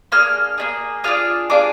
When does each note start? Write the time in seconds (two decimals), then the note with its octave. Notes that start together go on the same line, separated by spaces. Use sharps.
0.12 A#3 D4 G#4 F6
0.58 A#3 D4 G#4
1.04 D4 F4 G#4 F6
1.50 D4 F4 G#4 D6